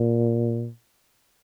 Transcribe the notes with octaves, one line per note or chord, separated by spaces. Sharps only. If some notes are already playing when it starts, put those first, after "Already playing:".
Already playing: A#2